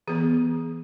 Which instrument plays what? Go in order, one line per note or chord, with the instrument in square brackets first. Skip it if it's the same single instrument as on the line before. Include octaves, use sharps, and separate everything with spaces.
[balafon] E3 B3 G#4